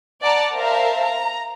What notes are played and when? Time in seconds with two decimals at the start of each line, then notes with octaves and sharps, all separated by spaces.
0.22 D5 F#5 A5 A#5
0.55 A#4 C5 E5 F5 A5 A#5
1.04 A#5